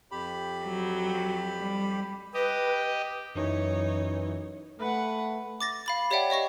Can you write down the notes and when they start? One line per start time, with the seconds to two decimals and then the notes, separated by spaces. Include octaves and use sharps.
0.12 F2 G4 B5
0.65 F#3
1.57 G3
2.34 G4 B4 D#5
3.35 F#2 E3 D#4 C#5
4.79 A3 B4 F#5
5.61 D6 A6 A#6
5.86 F5 B5 A6
6.11 G4 C#5 D5 E5 F#5 G5
6.30 C#5 D#5 C#6 A#6